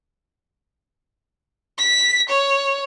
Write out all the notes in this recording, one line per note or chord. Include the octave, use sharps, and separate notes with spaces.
B6
C#5